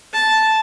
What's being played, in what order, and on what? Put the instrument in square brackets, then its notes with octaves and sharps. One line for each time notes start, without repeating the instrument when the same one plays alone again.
[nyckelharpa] A5